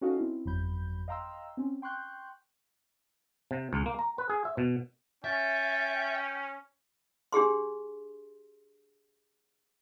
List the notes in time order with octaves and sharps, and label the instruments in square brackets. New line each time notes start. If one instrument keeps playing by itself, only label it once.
[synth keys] C#4 D#4 F#4 A4 D#5 F5
C4 E4
G1 F2 F#3 B5 G6
D#5 F5 G5 A#5 C6 E6
C4 C#4
G5 C6 C#6 F#6 G6
[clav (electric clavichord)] C3
C#2
A#3
A#5
B4
G#4
E5
B2
[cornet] C#4 [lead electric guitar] E5 [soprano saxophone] G5 [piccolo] A6
[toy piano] D4 G4 G#4 C6